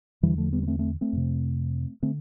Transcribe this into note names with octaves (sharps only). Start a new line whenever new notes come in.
E2 D3 E3 G3
F3 A3
G3 B3
B3
A3 C4
A3 C4
A3 C4
F2 C3
D3 A3 C4